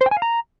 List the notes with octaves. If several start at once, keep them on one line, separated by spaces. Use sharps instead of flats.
C5
G5
G#5
F5
A#5